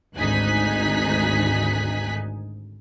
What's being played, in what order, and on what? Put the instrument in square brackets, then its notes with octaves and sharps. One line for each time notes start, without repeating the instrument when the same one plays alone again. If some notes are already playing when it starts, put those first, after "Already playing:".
[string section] G#1 D2 D#4 G#5 F#6 B6